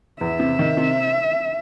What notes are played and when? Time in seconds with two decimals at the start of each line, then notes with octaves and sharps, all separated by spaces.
0.21 E2 E5
0.40 C3
0.59 D#3
0.77 C3